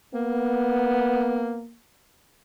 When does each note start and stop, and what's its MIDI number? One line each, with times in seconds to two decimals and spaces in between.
0.14 1.76 58
0.14 1.65 59